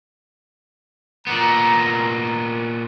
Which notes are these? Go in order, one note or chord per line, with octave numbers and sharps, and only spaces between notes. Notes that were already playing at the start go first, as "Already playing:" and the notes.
A#2 B3 A#5